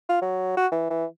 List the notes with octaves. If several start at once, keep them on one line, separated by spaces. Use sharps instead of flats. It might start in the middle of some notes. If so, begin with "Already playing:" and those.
F4
F#3
F#4
E3
E3